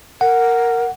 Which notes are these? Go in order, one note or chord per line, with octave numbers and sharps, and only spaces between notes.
A#4 F#5